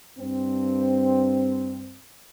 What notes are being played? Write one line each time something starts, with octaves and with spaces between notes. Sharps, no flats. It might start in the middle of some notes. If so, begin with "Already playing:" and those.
G2 C4